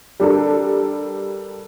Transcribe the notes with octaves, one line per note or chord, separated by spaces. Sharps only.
G3 D4 A4 A#4